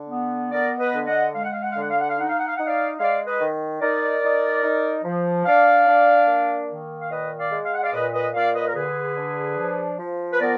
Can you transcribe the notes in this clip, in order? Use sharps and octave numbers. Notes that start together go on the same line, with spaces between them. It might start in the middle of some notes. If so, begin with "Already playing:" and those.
Already playing: D3
B3
B3 A#4 D5
B4 D#5
D3
D#5 F#5
G#3 F5
F#5
F5
F#5
D3 F5
F#5
F5
F#5
F5
D#4 F#5
F5
F#5
F5
D#4 F#5
D5 F5
G#3 D5 F5
B4 D#5
D#3
D#4 A#4 D5
D#4
D#4
F3
D4 D5 F5
D4
A#3
D#3
F5
A#2 B4 D#5
D5 F5
G#3
F5
F#5
D5 F5
A#2 B4 D#5
B4 D#5
A#2 D5 F5
B4 D#5
A#4
D3 G#4 B4
D4
F3
F3
B4
B3 A#4 D5